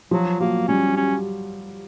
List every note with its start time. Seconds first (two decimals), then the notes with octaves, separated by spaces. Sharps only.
0.11 F3 F#3
0.40 F#3 A#3
0.68 G3 C#4
0.97 C#4